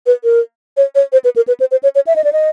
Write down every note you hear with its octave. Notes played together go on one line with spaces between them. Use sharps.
B4
A#4
C#5
C#5
C5
B4
A#4
B4
C5
C5
C#5
C#5
E5
D#5
D5
D#5